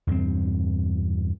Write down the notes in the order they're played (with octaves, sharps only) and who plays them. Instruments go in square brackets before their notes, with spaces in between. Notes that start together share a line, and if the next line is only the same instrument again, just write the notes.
[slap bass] E2 G2 B2 C4